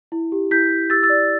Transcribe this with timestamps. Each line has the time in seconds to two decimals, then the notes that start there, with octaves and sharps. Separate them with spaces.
0.12 E4
0.32 G4
0.51 E4 G6 B6
0.71 E4
0.90 G4 E6 A6
1.03 E6 A6
1.10 D5